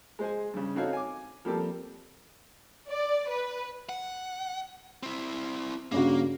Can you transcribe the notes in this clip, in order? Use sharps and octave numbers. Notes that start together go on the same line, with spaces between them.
G#3 C5 G#5
G2 C#3
C4 D#4 F#4 A4 C#5 F5
G#5 D6
F3 G3 A#3 C4 G4 A4
D5
B4
F#5
C4 E4
G2 C#3 A#3 F#4